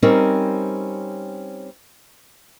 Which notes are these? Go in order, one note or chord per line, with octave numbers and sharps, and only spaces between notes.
G3 C4 C#4 D#4 A#4 C#5